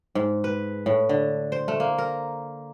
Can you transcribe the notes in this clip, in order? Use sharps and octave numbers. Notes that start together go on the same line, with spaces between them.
G#2
B4
A2
D3
C5
A3
A#3
A#4